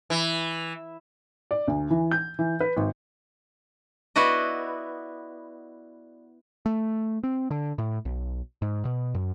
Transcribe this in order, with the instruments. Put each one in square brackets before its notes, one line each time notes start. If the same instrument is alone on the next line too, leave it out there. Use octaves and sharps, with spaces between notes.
[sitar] E3
[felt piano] D5
D2
E3
G6
E3
B4
G#1
[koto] B3 E4 F#4 D5 D#5
[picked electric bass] A3
C4
D3
A2
B1
G#2
B2
F#2